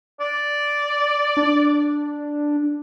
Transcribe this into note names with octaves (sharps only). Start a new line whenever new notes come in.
D5
D4